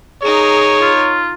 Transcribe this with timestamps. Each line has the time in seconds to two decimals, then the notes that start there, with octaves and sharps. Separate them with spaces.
0.22 D#4 G#4 A#4 C#5
0.82 F4